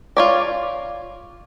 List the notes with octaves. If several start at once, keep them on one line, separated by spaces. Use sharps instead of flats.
F4 C#5 D5